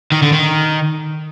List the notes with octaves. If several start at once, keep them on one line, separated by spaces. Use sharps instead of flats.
D#3
D3
D#3